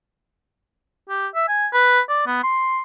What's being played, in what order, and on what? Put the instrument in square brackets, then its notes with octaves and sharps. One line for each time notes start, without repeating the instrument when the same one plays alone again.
[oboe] G4
E5
G#5
B4
D5
B3
C6